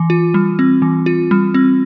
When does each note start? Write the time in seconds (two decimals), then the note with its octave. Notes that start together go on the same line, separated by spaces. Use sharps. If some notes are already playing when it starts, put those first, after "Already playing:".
Already playing: E3
0.10 F4
0.34 G3
0.59 C4
0.82 E3
1.06 F4
1.31 G3
1.54 C4